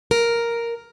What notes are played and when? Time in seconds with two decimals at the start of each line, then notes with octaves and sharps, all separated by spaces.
0.11 A#4